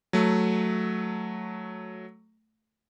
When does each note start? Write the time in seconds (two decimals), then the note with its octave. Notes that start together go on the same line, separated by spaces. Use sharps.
0.13 F#3 A3